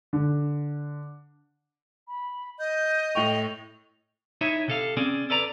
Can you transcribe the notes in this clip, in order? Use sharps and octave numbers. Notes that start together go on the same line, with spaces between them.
D3
B5
D#5 G6
A2 G5 C#6 F7
D#4 E4 C#5 E5
C3 A4 F5
C4 C#4 G#4 D5
A4 B4 D5 A#5